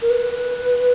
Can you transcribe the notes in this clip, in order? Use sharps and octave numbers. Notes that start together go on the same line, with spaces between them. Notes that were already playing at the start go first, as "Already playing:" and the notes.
A#4
B4